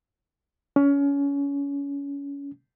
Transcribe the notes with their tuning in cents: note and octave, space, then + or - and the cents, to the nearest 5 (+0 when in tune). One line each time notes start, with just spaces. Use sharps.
C#4 +25